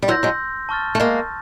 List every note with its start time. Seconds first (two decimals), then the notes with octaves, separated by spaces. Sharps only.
0.02 G3
0.08 E3 F#3 C6 E6 G6 A#6
0.23 F#3 G#3
0.69 A5 C#6 F6 A6
0.95 A3
1.00 G#3 A#3